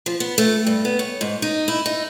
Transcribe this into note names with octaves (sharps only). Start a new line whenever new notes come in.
F3
B3
A3
G2
B3
C#5
G#2
D#4
E4
D#4